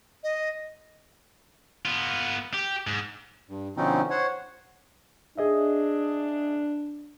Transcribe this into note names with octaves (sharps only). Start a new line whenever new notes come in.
D#5
B3 F4
G4
G#2
G2
B2 D3 F3 C4 C#4 D#4
C5 C#5 F#5
D4 G#4 D#5 E5